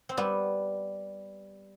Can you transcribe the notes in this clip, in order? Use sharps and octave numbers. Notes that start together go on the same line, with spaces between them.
C4
G3 B3